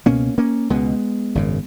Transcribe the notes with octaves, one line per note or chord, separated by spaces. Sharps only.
C#2 B2 A#3 C#4
A#3 C#4
C#2 B2 G#3 B3
G#1 F#2 C#3